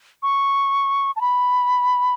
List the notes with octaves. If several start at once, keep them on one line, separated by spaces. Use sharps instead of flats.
C#6
A5
B5